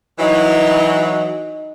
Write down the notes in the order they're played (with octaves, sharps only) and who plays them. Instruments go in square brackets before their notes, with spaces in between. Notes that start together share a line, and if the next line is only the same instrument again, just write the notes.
[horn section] E3 F#3 [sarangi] D#4